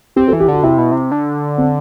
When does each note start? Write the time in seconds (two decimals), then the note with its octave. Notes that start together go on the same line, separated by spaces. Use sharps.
0.16 C4 G4
0.28 A4
0.33 E3
0.40 G4
0.48 D3 F#4
0.63 C3 E4
0.78 B2
0.92 C3
1.11 D3
1.58 C4